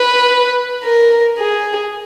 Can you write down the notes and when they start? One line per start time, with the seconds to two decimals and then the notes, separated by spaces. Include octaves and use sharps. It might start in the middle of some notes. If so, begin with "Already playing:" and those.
Already playing: B4
0.84 A#4
1.39 G#4